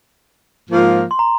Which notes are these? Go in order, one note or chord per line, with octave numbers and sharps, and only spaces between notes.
G#2 F3 A#3 F4 A#4
C6
A#5